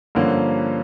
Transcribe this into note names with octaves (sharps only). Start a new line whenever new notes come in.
G2 D3 F3 A#3 C#4